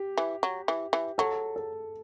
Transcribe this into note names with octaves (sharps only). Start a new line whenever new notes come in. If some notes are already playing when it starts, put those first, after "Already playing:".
Already playing: G4
E3
F#3
E3
E3
F#3 A4
A4